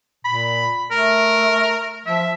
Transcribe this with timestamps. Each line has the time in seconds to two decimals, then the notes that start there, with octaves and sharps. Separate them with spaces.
0.25 A#2 B5
0.91 A3 A#4
2.06 F3 E5